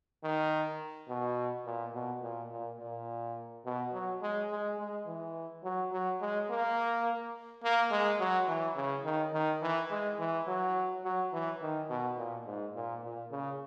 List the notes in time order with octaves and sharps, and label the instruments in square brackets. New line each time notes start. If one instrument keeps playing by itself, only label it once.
[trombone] D#3
B2
A#2
B2
A#2
A#2
A#2
B2
F#3
G#3
G#3
G#3
E3
F#3
F#3
G#3
A#3
A#3
G#3
F#3
E3
C#3
D#3
D#3
E3
G#3
E3
F#3
F#3
E3
D#3
B2
A#2
G#2
A#2
A#2
C#3